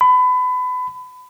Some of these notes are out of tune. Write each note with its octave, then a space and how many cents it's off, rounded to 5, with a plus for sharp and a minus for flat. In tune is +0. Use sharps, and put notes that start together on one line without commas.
B5 +30